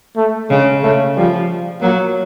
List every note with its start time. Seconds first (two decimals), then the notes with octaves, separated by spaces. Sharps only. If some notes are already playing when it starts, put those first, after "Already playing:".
0.17 A3
0.50 C#3 G#3
0.83 C#3 A3
1.16 F3 G3
1.82 F#3 A#3